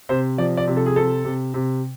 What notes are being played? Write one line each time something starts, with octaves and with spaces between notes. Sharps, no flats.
C3 C5
F3 D5
D5
C3
A4
G#4
C3 A4
C3
C3